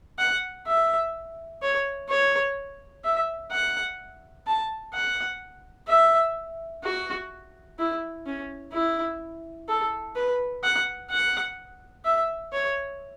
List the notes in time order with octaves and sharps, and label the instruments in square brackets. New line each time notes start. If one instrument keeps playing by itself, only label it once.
[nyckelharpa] F#5
E5
C#5
C#5
E5
F#5
A5
F#5
E5
F#4
E4
C#4
E4
A4
B4
F#5
F#5
E5
C#5